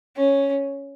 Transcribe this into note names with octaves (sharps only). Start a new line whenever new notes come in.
C#4